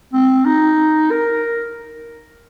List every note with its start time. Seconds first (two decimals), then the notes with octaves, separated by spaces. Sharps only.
0.13 C4
0.46 D#4
1.11 A#4